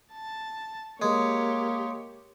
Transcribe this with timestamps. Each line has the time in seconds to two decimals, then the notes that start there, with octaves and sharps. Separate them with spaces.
0.13 A5
1.02 G#3 A#3 G4 C#5